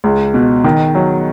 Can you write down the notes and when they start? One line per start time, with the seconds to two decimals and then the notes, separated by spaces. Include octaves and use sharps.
0.04 C#2
0.34 B2
0.64 D#3
0.95 F#3